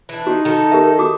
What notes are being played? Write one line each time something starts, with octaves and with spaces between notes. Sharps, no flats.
E3 D4
D#4 F#4
D#3 A4
G4 A#4 E5
F#4 D6 D#6